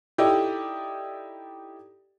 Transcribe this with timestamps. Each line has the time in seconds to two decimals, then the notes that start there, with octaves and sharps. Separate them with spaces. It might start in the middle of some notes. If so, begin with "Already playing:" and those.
0.18 D#4 E4 G4 A4 D5 D#5